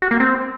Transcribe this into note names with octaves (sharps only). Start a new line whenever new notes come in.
F#4
A#3
C4